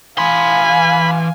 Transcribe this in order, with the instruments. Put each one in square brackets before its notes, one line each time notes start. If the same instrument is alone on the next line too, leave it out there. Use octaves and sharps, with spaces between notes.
[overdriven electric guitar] E3 C6 [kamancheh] F5 G#5 [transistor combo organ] B5